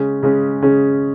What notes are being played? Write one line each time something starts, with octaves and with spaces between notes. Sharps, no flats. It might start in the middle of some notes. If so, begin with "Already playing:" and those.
Already playing: C#3 G#3 C#4
C#3 G#3 C#4
C#3 G#3 C#4